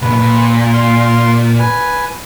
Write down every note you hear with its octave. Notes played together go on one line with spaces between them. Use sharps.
B1 A#2 B4
A#2
F5 C6
B4 G#5